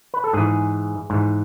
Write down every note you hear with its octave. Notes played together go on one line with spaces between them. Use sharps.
B4
A4
G#2 E3 G#4
G#2 E3